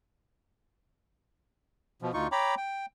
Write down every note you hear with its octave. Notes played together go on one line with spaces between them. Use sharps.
B2 F3
D2 D#4 F4 C#6
C#5 G5 A#5 B5 D6
G5